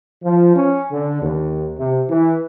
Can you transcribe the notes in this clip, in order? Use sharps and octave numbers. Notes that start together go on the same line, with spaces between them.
F3
C#4
D3
D#2
C3
E3